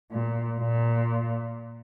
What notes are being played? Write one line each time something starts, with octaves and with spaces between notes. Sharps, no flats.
A#2
A#2